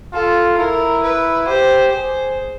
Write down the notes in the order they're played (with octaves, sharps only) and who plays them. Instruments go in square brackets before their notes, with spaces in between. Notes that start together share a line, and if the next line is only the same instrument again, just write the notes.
[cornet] F4 [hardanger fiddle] A4
[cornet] E4 [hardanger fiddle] A#4
[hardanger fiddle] B4
[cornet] G4 [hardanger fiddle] C5
[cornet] G#4 [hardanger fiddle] C5